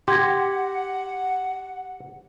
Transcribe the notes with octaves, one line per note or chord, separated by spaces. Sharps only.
G4 F#5 C6 G#6 A#6